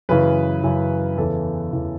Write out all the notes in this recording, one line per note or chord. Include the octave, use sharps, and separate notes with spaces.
F#2 C#3 E3 B4
F#2 C#3 E3
E2 C#3 E3 A4
E2 C#3 E3